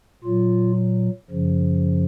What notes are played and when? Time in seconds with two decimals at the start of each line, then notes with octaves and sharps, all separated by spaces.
0.24 A#2 F#3 F4
1.31 F#2 C#3 F3